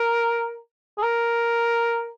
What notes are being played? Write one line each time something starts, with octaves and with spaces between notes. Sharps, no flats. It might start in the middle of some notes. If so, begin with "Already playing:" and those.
Already playing: A#4
G#4
A#4